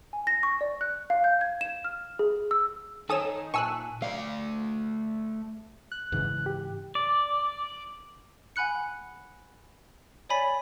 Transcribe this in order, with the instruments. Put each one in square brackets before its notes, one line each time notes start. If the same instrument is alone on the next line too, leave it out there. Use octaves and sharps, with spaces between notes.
[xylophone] G#5
A#6
C#6
D5
F#6
F5
G6
G#6
E7
F6
G#4
E6
[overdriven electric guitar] D#3 [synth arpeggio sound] A4 D#6 E7 [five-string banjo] C#5 G#5
[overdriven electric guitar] A#2 [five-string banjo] G#5 A5 [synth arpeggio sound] C#6 E6 F#6
[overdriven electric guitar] A3 D5 [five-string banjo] F5
[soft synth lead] F#6
[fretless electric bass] G#2 C#3 E3
[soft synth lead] G4
[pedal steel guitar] D5
[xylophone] F#5 G#5 B5 F#6 C#7
C#5 D5 G#5 B5 A6 B6